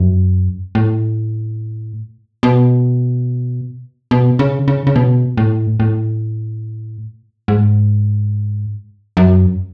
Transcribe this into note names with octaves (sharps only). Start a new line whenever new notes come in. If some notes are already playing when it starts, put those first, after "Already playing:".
Already playing: F#2
A2
B2
B2
C#3
C#3
C#3
B2
A2
A2
G#2
F#2